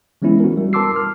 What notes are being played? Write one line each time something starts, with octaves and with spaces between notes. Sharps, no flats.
E3 G#3 B3 C#4 E4
F#4 A#4
G3
A#4 A5 C6 D6 E6 C7
F6